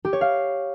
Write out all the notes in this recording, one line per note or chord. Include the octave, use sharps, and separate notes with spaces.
G4
C#5
F5